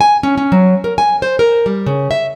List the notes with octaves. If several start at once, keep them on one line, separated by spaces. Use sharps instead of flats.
G#5
C#4
C#4
F#3
A#4
G#5
C5
A#4
G3
C#3
E5